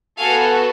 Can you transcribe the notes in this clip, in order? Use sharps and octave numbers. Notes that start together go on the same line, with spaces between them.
B3 F#4 A4 F5 G#5